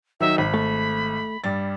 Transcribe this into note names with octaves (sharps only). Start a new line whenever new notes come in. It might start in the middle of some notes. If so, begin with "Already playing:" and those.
D#3 F#3 D#4 E5
G#1 B5
A3
G2 G3 A6